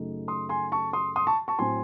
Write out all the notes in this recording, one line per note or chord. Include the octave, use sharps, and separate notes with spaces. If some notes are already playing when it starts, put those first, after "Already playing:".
Already playing: F#2 C#3 F#3 A3 D#4
C6 D#6
G#5 C6
A5 C#6
C6 D#6
C6 D#6
A5 C#6
A5 C#6
A2 F#3 C4 G#5 C6